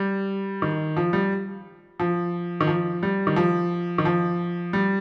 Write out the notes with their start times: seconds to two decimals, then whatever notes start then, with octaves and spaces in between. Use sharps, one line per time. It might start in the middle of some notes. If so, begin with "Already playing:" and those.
Already playing: G3
0.62 D#3
0.97 F3
1.13 G3
2.00 F3
2.61 D#3
2.67 F3
3.03 G3
3.27 D#3
3.36 F3
3.98 D#3
4.05 F3
4.73 G3